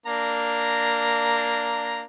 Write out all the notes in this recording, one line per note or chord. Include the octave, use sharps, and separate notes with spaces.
A#3 D4 A#5